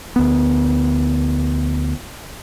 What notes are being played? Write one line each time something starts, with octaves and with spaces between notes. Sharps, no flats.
D2 B3